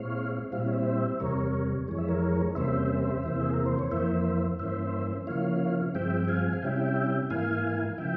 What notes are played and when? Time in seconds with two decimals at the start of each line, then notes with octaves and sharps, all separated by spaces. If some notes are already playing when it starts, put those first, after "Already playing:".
Already playing: A#2 G#3 C4 E4 C#5 F5
0.52 A#2 G3 C4 E4 F5
0.60 E5
0.67 C#5
0.73 C5 E5
1.20 E2 C3 G3 A#4 C#5
1.88 F2 E3 G#3 C#5
1.98 E5
2.08 A#4 C#5
2.55 E2 C3 G3 A#3 C#4 C5 E5
3.23 E2 C3 E3 A#3
3.41 G#4
3.53 A#4
3.66 C5
3.79 C#5
3.91 F2 E3 A#3 C5 E5
4.59 G2 E3 A#3 C#4 C5 E5
5.27 C#3 F3 A#3 E4 C#5 F5
5.95 G2 F3 G#3 C4 E5 G5
6.20 G5
6.28 F5 G#5
6.53 F5
6.63 C3 G3 C#4 E4 E5 G5
7.30 G#2 E3 A#3 E4 F5 G#5
7.98 C#3 F3 E5 G5